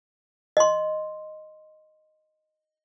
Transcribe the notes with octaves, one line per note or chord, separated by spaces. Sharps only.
D#5 C6